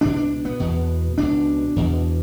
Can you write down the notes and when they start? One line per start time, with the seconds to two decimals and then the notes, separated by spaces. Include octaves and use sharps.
0.01 C#2 B2 D4
0.16 D4
0.45 B3
0.60 E2 B2
1.18 C#2 B2 D4
1.76 E2 B2